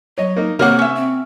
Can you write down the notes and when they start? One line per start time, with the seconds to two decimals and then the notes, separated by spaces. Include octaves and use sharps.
0.18 F#3 C#5 D#5
0.36 A#3 D#4
0.59 C3 A#3 A#4 C#5 F#5 D6
0.79 C#4 E5
0.96 C4